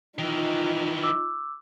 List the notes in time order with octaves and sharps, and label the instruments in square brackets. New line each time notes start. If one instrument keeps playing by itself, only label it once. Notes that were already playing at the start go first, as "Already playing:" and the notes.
[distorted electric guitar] D#3 E3 [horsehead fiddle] D#4 F4
[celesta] D6 E6